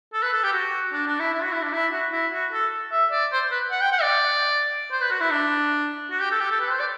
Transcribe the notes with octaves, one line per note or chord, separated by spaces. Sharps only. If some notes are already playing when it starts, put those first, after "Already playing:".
A4
B4
A4
G4
F#4
D4
D4
E4
E4
F#4
E4
D4
E4
F#4
E4
F#4
A4
E5
D5
C5
B4
F#5
G5
F#5
D5
C5
B4
F#4
E4
D4
F#4
G4
A4
G4
A4
B4
C5
D5